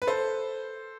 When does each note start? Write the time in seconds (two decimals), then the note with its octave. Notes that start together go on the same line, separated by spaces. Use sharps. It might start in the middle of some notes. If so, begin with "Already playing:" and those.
0.02 B4
0.07 A4 C5